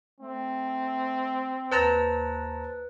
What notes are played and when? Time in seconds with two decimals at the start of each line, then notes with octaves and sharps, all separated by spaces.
0.21 A3 C4
1.72 D#2 B4 C5 A5 A#5 F#6